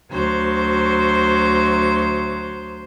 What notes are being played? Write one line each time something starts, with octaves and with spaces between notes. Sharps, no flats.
D2 F#3 C5